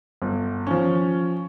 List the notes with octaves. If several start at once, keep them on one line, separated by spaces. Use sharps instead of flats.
G1
F3 C#4